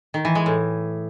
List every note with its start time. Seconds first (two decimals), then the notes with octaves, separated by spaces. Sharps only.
0.14 D#3
0.25 E3
0.35 G#3
0.46 A2